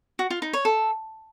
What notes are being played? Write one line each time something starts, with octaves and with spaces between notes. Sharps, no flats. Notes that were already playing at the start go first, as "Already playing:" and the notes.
F#4
F4
D#4
C#5
A4